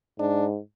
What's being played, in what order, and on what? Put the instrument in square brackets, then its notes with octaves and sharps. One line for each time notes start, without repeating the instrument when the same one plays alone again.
[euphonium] G#2 [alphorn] D4